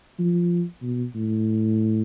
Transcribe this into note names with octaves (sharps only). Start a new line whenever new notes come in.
F3
B2
A2